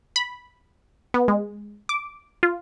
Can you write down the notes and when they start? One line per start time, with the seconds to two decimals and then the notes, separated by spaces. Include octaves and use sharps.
0.16 B5
1.14 B3
1.28 G#3
1.89 D6
2.43 F4